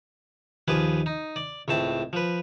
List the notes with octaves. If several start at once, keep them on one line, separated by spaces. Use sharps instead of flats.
D#2 F3 G#4 B4 D6
D#4
D5
C#2 A2 C4 A5
F3 B4